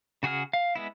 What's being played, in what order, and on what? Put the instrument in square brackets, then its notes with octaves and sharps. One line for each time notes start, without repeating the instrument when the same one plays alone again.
[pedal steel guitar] C#3 F#4 G#4 F#5 F6
F5
G#3 B3 E4